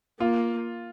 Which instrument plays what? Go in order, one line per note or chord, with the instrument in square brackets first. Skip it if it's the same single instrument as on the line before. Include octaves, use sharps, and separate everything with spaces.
[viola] A#3 [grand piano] F4